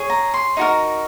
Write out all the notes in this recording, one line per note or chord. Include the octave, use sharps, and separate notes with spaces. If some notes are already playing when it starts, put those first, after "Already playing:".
Already playing: G#4 C#5
A#5
C6
D#4 F#4 A#4